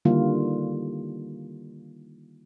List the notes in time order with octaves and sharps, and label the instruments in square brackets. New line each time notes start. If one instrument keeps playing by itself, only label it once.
[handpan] D3 D#3 G3 A#3 E4 F4